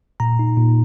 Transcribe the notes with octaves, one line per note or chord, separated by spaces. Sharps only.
A#2 A#5
D#4
A#2